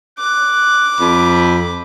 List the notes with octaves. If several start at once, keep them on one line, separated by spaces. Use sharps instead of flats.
D6 F#6
F2 B5